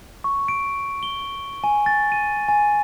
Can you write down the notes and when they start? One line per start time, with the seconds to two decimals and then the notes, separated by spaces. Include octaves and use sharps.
0.24 C#6
0.48 D7
1.03 G7
1.64 G#5
1.86 A6
2.12 D#7
2.48 G#5